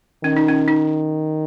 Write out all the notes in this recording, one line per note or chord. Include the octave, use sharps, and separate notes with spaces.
D#3 C#4
D#4
C#4
D#4